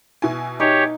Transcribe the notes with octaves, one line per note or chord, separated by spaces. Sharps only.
B2 E4 G#5
D#4 G4 C#5